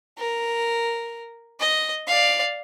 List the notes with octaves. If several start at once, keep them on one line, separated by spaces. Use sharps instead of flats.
A#4
D#5
D5 F5